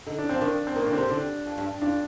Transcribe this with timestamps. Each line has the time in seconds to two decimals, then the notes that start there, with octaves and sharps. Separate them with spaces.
0.07 D3 D#4
0.18 D4
0.29 F3 C4
0.41 D#3 D4
0.67 C4
0.76 D#3 A#3
0.86 D3 D4
0.93 C3 C4
1.08 D3 D4
1.46 F2
1.58 G2
1.81 F2 D4